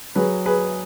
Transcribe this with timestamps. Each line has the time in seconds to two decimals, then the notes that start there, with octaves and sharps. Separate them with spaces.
0.15 F#3 G#4 B4
0.46 G#4 B4